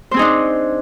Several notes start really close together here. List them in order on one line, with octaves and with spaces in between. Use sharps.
C5 C4 G#4 D#4 D4